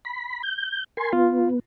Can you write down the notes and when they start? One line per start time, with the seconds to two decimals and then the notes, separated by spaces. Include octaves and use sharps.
0.05 B5
0.43 G6
0.97 A#4 G#5 C6
1.13 B3 F4